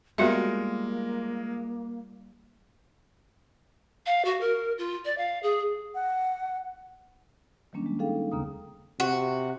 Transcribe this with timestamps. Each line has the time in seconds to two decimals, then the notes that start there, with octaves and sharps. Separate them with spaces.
0.18 G3 G#3 A#3 B3 F4 F#4 A#4 E5
4.06 F5
4.25 F#4
4.41 A#4
4.78 F4
5.05 D5
5.18 F5
5.43 G#4
5.95 F#5
7.73 D#3 F#3 G3 A#3 C#4 D4
7.86 G#3
7.99 C#4 D#4 G#4 A4 F5 G5
8.32 D#2 C#3 B3 A#5 D#6
9.00 C3 F#4